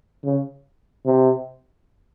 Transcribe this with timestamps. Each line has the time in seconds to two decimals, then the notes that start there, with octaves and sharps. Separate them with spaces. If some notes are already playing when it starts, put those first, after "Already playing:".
0.25 C#3
1.06 C3